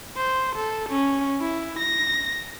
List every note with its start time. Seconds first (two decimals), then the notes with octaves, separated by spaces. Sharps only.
0.17 C5
0.55 A4
0.89 C#4
1.41 E4
1.79 A#6